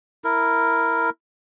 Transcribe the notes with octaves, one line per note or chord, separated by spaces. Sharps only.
E4 A#4